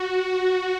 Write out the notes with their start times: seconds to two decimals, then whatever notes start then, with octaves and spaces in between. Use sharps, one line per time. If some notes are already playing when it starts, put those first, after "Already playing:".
Already playing: F#4
0.23 F#4